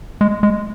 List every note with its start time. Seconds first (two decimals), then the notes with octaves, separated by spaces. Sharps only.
0.21 G#3
0.43 G#3